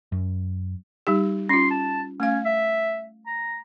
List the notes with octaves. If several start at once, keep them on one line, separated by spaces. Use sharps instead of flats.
F#2
G3 D#4 G4
C#4 F4 C6
A5
A3 C#4 F5
E5
A#5